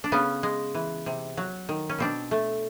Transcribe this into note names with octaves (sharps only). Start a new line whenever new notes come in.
D4
C#3 B3 C#4
G#3
E3
C3
F#3
D#3
C#4
B2 C4 D4
A3